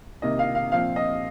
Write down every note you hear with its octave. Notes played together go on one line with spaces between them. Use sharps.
C3 D#3 A#3 D#5
F5
F5
A#2 F3 C4 F5
D#5